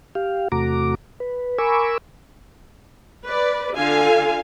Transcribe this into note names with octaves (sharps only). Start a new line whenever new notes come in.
G4 F5
E2 C3 A3 F#4 A#5 D6
B4
A#4 G#5 B5 C#6 D6 E6
B4 D5
D3 F4 F5 G#5